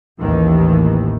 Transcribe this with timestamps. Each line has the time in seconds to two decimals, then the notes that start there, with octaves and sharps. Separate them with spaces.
0.18 A1 D#2 D#3 E3